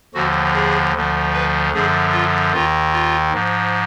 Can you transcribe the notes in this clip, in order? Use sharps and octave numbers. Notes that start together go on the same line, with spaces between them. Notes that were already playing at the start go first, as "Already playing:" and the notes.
D#2 D3 F3 F#4
G#4
D2 D3 F3
B4
F#2 D3 F3 G#4
F4
D#2 D#3 F4
F4
G#2 F3